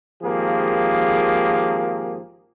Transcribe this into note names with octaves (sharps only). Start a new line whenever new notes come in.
G#1 F3 A#3 G4 G#4